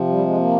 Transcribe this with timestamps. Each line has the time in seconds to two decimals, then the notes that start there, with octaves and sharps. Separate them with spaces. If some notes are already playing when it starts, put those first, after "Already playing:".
Already playing: C3 F3
0.08 G3
0.18 A#3
0.22 G#3
0.37 A#3